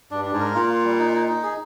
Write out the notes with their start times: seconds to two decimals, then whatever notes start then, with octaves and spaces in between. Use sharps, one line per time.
0.11 G2 D4
0.25 D4
0.33 G#2
0.40 A#4
0.54 A#2 F4
0.69 F4
0.84 G3
0.99 D#4
1.13 D#4
1.28 D#4
1.43 G#4